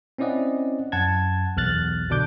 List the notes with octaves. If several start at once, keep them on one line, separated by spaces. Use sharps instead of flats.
C4 C#4 E4 D5 D#5 F#5
F#2 F#5 A5 G#6
B1 E2 F6 F#6 A6
B2 D3 D4 D6 G6